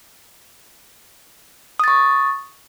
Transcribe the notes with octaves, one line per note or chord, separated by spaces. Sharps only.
C#6 D#6 A6